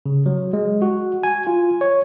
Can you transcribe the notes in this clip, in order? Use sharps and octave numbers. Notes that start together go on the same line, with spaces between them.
C#3
F#3
G#3
F#4
G#5
F4
C#5